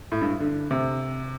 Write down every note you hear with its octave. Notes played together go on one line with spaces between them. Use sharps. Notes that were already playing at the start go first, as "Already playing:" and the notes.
A2
G2
D3
C3